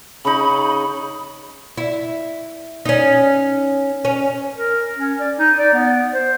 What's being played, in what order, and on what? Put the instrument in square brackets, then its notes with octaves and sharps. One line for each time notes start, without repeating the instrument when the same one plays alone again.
[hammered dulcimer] C#3 D#4 [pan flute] B5
[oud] E4
C#4 D#4
C#4
[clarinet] A#4
C#4
D5
D#4
D5
B3
C5